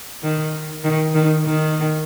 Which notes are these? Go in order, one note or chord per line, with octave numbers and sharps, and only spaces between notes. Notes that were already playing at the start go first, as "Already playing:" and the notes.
D#3
D#3
D#3
D#3